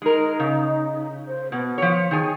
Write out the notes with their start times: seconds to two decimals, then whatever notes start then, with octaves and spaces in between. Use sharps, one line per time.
0.02 G#3 D#4 A#4
0.40 C#3
1.27 C5
1.52 B2 B3
1.78 F3 C#5
2.11 D#3 G#4 G#5